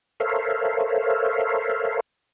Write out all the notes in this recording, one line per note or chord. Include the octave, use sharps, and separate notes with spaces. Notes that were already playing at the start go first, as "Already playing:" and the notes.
A4 A#4 C5 C#5 E5 F5